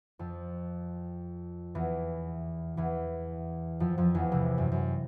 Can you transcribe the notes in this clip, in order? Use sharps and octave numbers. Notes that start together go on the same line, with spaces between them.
F2 F3
E2 E3
E2 E3
F2 F3
F2 F3
E2 E3
C2 C3
F#2
F#2